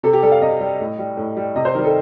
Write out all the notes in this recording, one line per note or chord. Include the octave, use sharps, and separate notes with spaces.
C3 A4
G4
G3 A4
F5
C3 D#5
G3
A2
G3
A2
G3
C3 D#5
C5
D#3 G3 A#4
A4